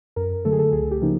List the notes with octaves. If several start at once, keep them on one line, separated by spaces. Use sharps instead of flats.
F#2 A#4
D3 F#3 A3 A4
G#4
A4
C#2 G#4
G4
C#3 F3 A#3 D#4